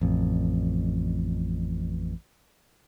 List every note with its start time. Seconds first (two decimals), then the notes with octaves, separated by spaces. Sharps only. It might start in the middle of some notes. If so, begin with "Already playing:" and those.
0.01 A1 F2